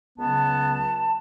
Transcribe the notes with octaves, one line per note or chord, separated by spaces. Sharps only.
C#2 C#3 F#3 B3 A5